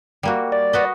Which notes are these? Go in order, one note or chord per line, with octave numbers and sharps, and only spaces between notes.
G3 A#3 F#4
D5
F#4 B4 D#5